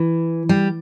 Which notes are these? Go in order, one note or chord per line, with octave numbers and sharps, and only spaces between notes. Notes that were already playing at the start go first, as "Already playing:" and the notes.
Already playing: E3
G3